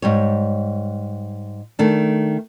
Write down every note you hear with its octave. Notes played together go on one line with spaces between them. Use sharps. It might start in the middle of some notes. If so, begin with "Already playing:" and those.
G#2 G3 C#5
D#3 A3 D4